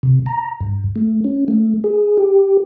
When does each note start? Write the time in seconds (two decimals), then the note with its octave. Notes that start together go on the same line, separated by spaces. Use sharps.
0.03 C3
0.26 A#5
0.60 G2
0.96 A3
1.24 C#4
1.48 A3
1.84 G#4
2.18 G4